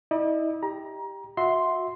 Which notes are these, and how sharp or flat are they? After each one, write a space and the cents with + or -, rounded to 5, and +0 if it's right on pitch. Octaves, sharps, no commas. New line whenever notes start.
E4 -40 D5 +45
G4 +10 A#5 +25
F#4 -25 E5 -20 C6 +0